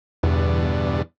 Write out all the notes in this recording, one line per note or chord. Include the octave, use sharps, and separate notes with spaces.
E2 G2 B2 D3